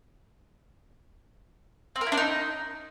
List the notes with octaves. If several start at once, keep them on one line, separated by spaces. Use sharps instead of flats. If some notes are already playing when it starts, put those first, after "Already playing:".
C4
A#4
E4
D4
D#4